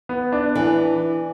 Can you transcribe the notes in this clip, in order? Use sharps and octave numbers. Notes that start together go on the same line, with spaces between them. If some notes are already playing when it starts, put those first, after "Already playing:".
B3
D4
E3